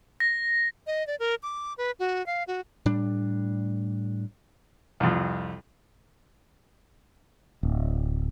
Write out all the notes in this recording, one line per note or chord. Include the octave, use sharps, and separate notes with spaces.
A#6
D#5
D5
A#4
D6
B4
F#4
F5
F#4
A2 G3 D4
C2 F2
D1